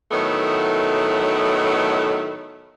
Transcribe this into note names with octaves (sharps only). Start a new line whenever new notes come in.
A2 D#3 F#3 A3 B3